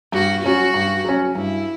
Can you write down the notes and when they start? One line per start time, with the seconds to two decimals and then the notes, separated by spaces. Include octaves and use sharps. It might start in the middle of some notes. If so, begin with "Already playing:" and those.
0.12 G2 F#4
0.43 F#3 C#4 F#4
0.74 G2
1.05 F#3 C#4
1.35 G2 E4